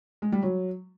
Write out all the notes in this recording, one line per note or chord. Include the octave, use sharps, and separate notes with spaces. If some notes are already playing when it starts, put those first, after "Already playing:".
G#3
G3
F#3